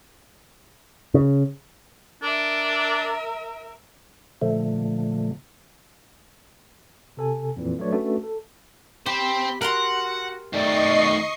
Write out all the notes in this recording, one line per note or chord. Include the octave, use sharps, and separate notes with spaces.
C#3
D4 A#4 E5
A#2 D3 F3 A3
C3 A4 G#5
F2 A#2 E3
F#3 A3 D4 B4 C#5 D5
A3 C#4 D4 F#4 B4
A4
C4 G4 C5 B5
F#4 A#4 F#5 A#5 C6
D#3 A3 D5 D#5 C#6 C7